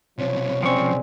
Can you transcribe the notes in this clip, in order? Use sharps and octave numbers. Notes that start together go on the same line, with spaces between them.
B1 C3 F3 C#4 C#5
F2 F3 G#3 C4 C#4 D5 C#6